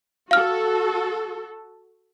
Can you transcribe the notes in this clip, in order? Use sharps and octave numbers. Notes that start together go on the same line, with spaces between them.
F#4 A4 F5 F6